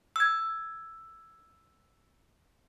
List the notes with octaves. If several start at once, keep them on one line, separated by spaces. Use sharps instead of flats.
E6 G#6